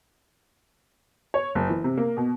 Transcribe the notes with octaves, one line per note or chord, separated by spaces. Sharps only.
C#5
F#1
E3
C3
A#3
B2